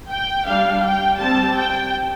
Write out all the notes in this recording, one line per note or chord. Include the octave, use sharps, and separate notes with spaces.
G5
G3 D4 F5
G5
G3 C4 A5
G5